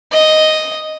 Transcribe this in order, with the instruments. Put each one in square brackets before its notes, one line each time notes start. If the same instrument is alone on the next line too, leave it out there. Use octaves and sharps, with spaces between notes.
[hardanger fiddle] D#5